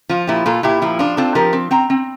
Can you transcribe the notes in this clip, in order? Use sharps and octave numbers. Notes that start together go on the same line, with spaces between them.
F3 F4
A#2 E4 G4
A#2 F4 A4
A#2 E4 G4
F3 E4
D4 F4
C4 F4 A4
F3 G4 A#4
C4
C4 G5 A#5
C4